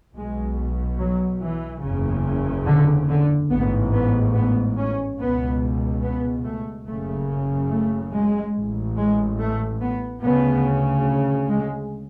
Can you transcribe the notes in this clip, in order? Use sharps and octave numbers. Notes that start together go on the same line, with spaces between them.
B1 B2 G#3
F#3
E3
F#1 E2 C#3
D3
D3
A1 G#2 B3
B3
B3
C#4
C#2 B2 B3
B3
A3
F#1 F#2 C#3 A3
A3
G#3
A1 A2
G#3
A3
B3
D2 C#3 B3
G#3